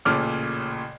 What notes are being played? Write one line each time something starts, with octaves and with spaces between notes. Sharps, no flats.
A1 A#2 C#3 A4 D6 F6